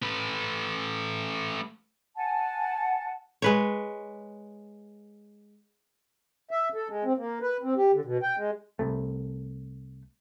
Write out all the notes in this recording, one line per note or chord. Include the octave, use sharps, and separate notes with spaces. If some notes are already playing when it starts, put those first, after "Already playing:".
A3 B4
F#5 G#5 A5
G#3 B4 C#5
E5
A4
G#3
C4
A#3
B4
C4
G4
D3
B2
G5
G#3
C2 A3